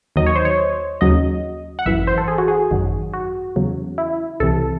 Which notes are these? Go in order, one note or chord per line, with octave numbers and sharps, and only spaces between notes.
D#2 D#3 F#3 D#5
C#5
C5
C#5
D#2 C#3 F#3 D#5
F#5
G#1 F#2 E3 E5
C5
A4
G#4
F#4
G#4
G#1 F#2 D#3 F#3
F#4
E2 C#3 F#3
E4
C2 C3 E3 A4